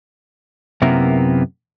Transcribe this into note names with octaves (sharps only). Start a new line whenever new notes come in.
F#2 C3 A#3 B3 E4 A#4